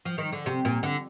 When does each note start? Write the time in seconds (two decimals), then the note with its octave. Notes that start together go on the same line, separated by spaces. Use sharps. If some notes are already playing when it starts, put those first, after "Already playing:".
0.05 F3
0.18 D#3
0.33 D3
0.46 C3
0.65 A#2
0.83 D3